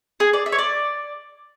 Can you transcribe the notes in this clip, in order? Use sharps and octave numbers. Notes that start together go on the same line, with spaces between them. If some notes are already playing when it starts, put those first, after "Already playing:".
G#4
D5
E5
C#5
D5